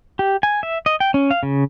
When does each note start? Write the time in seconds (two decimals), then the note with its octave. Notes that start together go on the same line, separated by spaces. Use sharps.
0.19 G4
0.43 G#5
0.63 E5
0.86 D#5
1.00 G5
1.14 C#4
1.31 F5
1.43 C#3